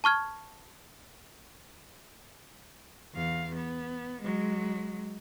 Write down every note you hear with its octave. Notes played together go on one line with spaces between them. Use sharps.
A5 C#6 F6 G#6
E2 F5
B3
F#3 G#3